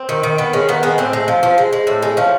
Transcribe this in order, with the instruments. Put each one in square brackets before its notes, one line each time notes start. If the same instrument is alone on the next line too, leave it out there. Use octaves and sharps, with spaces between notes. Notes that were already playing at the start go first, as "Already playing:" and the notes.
Already playing: [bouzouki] C4
D#3
D#3
D#3 B3
G#3 C#4
D#3 B3
G#3 B3
A2 C4
G#3
F3
F3
G#3
G#3
A2
G#3
F3 C#4